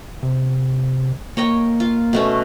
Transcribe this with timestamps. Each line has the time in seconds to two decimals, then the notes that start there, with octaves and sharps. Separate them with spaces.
0.23 C3
1.37 A#3 C#5 D#5 G5
1.80 F4
2.13 B2 A3 C#4